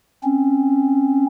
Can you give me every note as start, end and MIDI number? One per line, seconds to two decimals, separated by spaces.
0.24 1.26 60
0.24 1.26 61